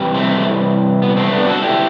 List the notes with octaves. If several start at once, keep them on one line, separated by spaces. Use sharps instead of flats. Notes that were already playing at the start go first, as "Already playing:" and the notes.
Already playing: C3 E3 G3
A3 C4
B3
A3 C4
B3 D4
F#4 A4
E4 G4